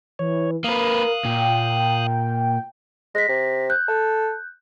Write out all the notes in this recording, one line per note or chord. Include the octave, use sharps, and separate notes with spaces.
E3 C#5
A#3 A#4 B4 F5 D#6 F#6
A#2 G5
G#3 A#6 B6
C3
F#6 G6
A4